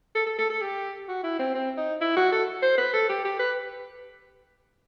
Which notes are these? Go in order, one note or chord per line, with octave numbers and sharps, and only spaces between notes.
A4
A4
A4
A4
G4
F#4
E4
C4
C4
D#4
E4
F#4
A4
C5
B4
A4
G4
G4
B4